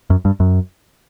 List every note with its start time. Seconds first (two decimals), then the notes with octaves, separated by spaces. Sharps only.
0.10 F#2
0.25 G2
0.40 F#2